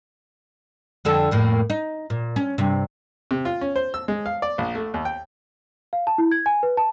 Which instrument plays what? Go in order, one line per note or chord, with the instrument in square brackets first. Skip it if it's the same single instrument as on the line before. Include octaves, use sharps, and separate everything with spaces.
[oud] F2 D3 A4
F2 A2 A#3
D#4
A#2
C#4
G2 C3
[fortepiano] C3
F4
C#4
C5
E6
G#3
F5
D5
A#1
A3
D#2
G5
[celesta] F5
A5
E4
G#6
G#5
B4
A5